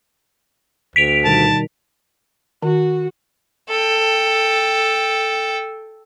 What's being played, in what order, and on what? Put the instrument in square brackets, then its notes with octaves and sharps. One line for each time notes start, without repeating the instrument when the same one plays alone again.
[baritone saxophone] D2 [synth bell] B6 D7 F7
[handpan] B2 D#3 G3 [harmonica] A5
[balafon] D#3 [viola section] F#4
[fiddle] A4 G5